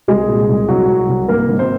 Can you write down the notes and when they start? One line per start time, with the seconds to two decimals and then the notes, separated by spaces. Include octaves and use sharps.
0.08 C2 G#3 G#4
0.29 A#2
0.48 C2
0.69 C2 F#3 F#4
0.89 C2
1.09 C2
1.28 G#1 A#3 A#4
1.49 G#1
1.59 C4 C5